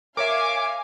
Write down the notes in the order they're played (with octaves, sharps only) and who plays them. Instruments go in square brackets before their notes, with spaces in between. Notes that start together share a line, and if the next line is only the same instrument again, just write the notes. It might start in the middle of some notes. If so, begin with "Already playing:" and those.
[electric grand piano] A#4 C#5 E5 [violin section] F5 G#5 [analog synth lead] D6